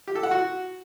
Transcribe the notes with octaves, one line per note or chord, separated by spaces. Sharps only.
G4
A4
F#5
F#4